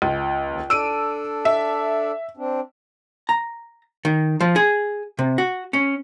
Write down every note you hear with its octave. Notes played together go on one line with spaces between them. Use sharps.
C#2
D#2
D4 A4 D5 E6 D7 D#7
E5
C4 D4
A#5
D#3
F3
G#4
C3
F#4
C#4